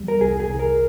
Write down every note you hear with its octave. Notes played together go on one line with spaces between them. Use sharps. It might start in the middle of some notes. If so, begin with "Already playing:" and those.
Already playing: E2 G3
A#4
C2 G#4
G#4
C2
A#4